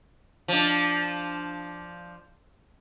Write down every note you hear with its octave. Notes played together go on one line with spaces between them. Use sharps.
F3 D4